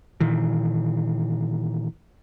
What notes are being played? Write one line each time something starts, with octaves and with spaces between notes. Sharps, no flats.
A#2 D#3 E3